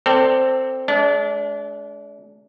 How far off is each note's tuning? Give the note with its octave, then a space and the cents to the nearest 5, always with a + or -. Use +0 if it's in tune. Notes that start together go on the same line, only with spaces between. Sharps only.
C4 +0 A4 +25 D5 +0
G#3 +35 D4 -35